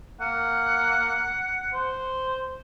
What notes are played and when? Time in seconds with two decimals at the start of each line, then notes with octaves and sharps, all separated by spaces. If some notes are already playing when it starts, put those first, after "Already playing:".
0.21 A#3 F#5
1.74 C5